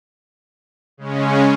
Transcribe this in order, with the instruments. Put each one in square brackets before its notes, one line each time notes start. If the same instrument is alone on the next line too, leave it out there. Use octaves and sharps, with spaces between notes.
[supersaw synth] C#3 G#3 C#4